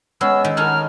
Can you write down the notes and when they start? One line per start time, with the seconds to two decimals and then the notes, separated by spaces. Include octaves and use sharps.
0.21 G#3 B3 C#4 E6
0.45 D#3
0.57 D#4 F#4 A4 A#4 G#5 F6